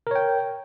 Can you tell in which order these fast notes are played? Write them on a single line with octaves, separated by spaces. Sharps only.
A#4 C#5 G5